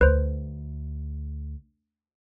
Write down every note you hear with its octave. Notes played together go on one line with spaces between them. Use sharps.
D2 B4 C5